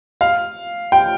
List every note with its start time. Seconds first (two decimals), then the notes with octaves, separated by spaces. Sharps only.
0.21 F5
0.92 G5